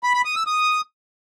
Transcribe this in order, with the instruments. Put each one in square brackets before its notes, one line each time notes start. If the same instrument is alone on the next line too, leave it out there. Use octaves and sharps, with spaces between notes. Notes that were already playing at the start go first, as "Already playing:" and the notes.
[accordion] B5
B5
D#6
E6
D#6